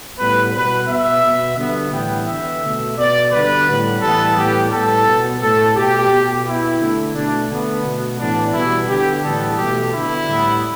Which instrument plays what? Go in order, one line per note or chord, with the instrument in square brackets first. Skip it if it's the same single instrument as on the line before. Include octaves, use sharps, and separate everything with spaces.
[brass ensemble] A2 G3 B3 B4
B2 B3 B4
B2 B3 E5
B2 B3
D3 G3 B3
A2 E3 G3 B3 G5
D3 B3 E5
B2 A3
B2 B3 D5
D3 G3 B3 B4
A2 G3 B3
A2 E3 G3 B3 A4
A2 G3 B3 G4
A2 G3 B3 A4
B2 B3
A2 A3 A4
B2 A3 G4
B2 B3
B2 B3 E4
D3 A3
B2 A3 D4
D3 A3 B3
B2 A3
A2 E3 B3 D4
B2 G3 B3 E4
D3 B3 G4
A2 E3 G3 B3 A4
B2 A3 G4
D3 B3 E4
A2 G3 B3